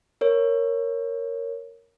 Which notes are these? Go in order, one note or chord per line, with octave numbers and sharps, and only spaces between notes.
A#4 C#5